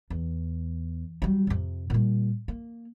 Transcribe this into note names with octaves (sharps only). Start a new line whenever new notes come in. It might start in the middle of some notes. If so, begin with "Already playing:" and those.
E2
F#3 G3
F2 C3
A#2 G3
A#3